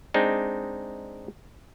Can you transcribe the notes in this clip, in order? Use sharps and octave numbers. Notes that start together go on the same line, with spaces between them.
G#3 C4 D4 D#4